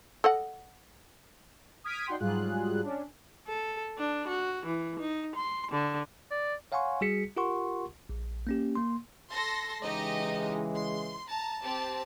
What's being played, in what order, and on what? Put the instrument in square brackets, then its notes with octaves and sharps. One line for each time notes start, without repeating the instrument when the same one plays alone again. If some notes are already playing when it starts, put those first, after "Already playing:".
[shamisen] A4 D#5 F#5
[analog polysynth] D#6 F6 G#6 B6 D7 D#7
D4 D#4 F#4 F#5 G5 C6
G#2 F#3 G3 F4 G#4 F#6
C#4 D4
[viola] A4
D4
F#4
E3
D#4
C6
D3
[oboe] D5
[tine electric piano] C#5 F5 F#5 G#5 C6 C#6
G3 F#4 G#4 B6 C#7
F4 G4 A#4 F#5 C6 C#6
A#1
A#3 C#4 G4
A#3 C6
[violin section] A4 C6 A#6
[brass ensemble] C#3 E3 G#3 [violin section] D#4 G4 D#5
[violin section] C6
A5 A#5
C4 G4 A5